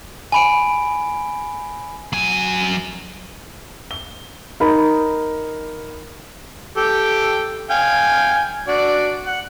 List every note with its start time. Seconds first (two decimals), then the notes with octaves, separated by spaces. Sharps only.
0.32 G#5 B5 D7
2.13 F#3 G#5
3.91 G7
4.60 D#4 A#4 B5
6.77 G4 A4 G5
7.70 F5 G5 G#5
8.68 D4 F#4 D5
9.26 F#5